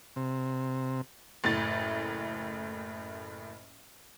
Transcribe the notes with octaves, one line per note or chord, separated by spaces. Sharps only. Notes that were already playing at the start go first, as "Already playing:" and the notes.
C3
F#1 A2 A6